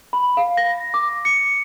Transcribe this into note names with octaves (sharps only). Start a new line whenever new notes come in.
B5
F5
A#6
D6
C#7